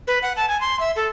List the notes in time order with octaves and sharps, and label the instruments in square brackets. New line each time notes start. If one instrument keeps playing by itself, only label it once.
[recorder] B4
F#5
A5
G#5
C6
E5
A4